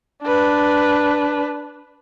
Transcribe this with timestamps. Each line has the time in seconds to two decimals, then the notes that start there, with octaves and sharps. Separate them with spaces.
0.23 D4 B4